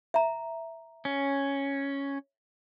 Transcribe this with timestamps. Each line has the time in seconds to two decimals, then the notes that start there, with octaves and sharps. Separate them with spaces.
0.14 E5 A#5
1.05 C#4